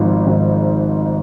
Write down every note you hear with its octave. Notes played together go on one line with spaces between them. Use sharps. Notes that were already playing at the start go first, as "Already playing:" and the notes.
Already playing: G#1 G#2 F3
G#1